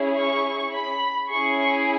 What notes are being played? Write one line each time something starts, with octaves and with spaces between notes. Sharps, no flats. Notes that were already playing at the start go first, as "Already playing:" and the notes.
Already playing: C#4 E4 G#4
C#6
B5
C#4 E4 G#4 C#6